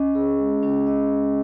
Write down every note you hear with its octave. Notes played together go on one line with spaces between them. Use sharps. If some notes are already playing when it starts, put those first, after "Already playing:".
Already playing: C#4 D#5
G#4
G#3
C#4
D#5
G#4